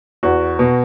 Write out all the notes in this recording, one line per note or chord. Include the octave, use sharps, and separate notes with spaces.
E2 F#4
B2